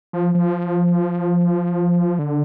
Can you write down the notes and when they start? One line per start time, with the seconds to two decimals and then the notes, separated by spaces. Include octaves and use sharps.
0.13 F3
0.35 F3
2.19 D3